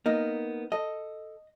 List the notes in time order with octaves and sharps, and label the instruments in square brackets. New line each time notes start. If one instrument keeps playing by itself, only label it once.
[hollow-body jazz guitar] A#3 B3 [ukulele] D#4
[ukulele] A4 [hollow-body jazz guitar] D#5